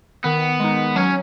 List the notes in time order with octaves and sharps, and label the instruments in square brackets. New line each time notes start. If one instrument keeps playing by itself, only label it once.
[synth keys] D#3 [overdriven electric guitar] B3
[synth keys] G#3 D#4
[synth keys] F#3 [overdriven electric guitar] C#4